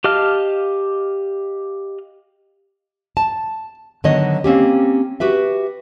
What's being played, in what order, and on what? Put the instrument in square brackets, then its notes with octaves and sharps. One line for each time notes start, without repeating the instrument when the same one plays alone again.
[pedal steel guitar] G4 D#5 F5 A5 F6
[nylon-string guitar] A5
D3 D#3 F#3 B3 C#5 D#5
A#3 C4 C#4 G4
F#4 G4 B4 E5